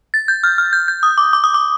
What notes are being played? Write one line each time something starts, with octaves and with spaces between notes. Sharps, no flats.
A6
G6
F6
F6
G6
G6
D#6
D6
D6
D#6
D6